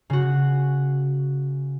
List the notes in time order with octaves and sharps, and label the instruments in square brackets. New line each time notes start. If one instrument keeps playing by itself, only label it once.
[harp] C#3 F#4